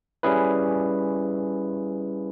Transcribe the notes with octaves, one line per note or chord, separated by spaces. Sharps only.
G3 C#4 E4 G#4 B4